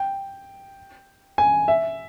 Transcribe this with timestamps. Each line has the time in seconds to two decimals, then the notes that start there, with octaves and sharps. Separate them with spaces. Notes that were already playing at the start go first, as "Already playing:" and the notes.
Already playing: G5
1.38 G#5
1.68 E5